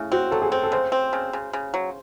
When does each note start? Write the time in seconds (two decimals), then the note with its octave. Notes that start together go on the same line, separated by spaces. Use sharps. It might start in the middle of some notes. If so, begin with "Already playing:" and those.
Already playing: C#3 A3 E4
0.12 C4 F#4
0.31 F#3 A4
0.42 G#4
0.52 C4
0.63 A4
0.72 C#3 C5
0.92 C4
1.13 C#3
1.33 C#3
1.53 C#3
1.74 F#3